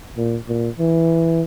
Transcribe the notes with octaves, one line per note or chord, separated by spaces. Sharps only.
A#2
A#2
E3